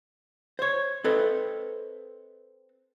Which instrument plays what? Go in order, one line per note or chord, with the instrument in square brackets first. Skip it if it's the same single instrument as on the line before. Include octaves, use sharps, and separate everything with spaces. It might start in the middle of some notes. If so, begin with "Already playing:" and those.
[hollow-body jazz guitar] C5 C#5
C4 A4 B4 D#5